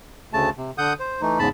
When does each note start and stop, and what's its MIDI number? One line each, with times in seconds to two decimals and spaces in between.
0.33 0.50 38
0.33 0.50 49
0.33 0.50 57
0.33 0.50 81
0.58 0.71 48
0.78 0.93 50
0.78 0.93 78
0.78 0.93 87
0.78 0.93 91
0.99 1.21 72
1.22 1.39 52
1.22 1.39 57
1.22 1.39 63
1.39 1.49 40
1.39 1.49 44
1.39 1.49 49
1.39 1.49 81
1.39 1.49 83